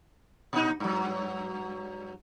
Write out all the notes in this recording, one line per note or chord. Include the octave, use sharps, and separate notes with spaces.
A#2 D#4
G2 F#3